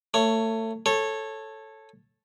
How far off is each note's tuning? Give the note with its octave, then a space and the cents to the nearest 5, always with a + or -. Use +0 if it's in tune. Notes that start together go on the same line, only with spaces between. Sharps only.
A3 +30 C#5 +0
A4 +0 C#5 -15